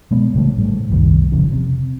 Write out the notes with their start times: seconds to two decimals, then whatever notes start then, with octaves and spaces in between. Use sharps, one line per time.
0.11 B2 G#3 B3
0.34 A1 C#3 G3 A3
0.58 A2 G3 A3
0.90 F#1 C2 D#3 G3
1.32 F1 C#3 F3
1.52 C3